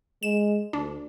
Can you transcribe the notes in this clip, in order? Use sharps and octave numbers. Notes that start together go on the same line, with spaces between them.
G#3 E7
D2 D4